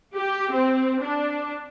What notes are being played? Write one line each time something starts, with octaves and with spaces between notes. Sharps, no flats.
G4
C4
D4